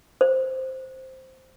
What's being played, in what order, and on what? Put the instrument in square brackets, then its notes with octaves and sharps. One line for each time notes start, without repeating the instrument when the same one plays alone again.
[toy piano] C5